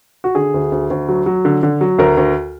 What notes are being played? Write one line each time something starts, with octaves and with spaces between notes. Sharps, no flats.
F#4
D3 G#4
D2
D2
D2
F#3
F#3
D3
D3
F#3
D2 A#4
D2